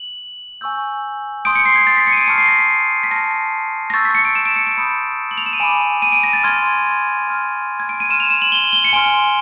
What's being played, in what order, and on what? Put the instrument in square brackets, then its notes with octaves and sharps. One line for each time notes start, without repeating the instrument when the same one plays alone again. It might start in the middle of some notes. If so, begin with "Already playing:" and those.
Already playing: [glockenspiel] F#7
G#5 C#6 E6 G6
C6 D#6 G6 D7
C#7
C7
G#6
A6
B6
C#7
D#7
D7
A5 C#6 F6 C#7
C7
A#6
B6
B6
A5 C6 F6 A#6
A#6
C#6 E6 G6 A6
B6
C#7
D7
E7
D7
C#7
D7
B5 D#6 G6 C#7
F#7
F7
E7
D#7
G#5 B5 D6 D7
D#7
D7
A#6
A6
C6 F6 G#6
C6 F6
G#6
D7
D#7
C6 F6 E7
F7
E7
F#7
G7
G7
C#7
G#5 C6 F6 D7